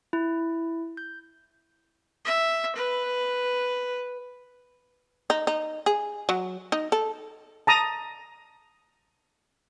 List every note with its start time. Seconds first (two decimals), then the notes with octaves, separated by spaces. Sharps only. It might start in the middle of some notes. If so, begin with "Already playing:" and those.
0.13 E4
0.97 G6
2.25 E5
2.76 B4
5.30 D#4
5.47 D#4
5.86 G#4
6.29 F#3
6.72 D#4
6.92 A4
7.67 A5 A#5 D#6